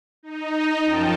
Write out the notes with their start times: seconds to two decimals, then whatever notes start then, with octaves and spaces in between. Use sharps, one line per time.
0.23 D#4
0.84 F#2 F3 G5 A5